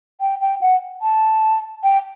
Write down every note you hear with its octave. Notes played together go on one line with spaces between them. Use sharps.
G5
G5
F#5
A5
G5